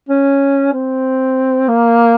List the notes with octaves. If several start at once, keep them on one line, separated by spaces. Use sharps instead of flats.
C#4
C4
A#3